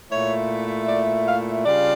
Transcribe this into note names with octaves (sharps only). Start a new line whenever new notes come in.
A#2 A3 E4 C#5
D5
F5
C#3 G3 D4 F4 D5